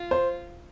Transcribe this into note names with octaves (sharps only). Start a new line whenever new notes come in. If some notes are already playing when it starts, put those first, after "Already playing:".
Already playing: F4
C5